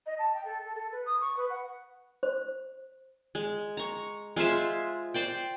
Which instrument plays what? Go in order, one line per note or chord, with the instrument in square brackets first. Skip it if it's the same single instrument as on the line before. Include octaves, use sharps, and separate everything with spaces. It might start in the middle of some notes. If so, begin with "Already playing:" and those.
[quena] D#5
A5
G5
A4
A4
A4
B4
D#6
C#6
B4
F#5
[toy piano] C5
[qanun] G#3
A#5 C#6
G#3 F4 C5 E5
C5 D5 G5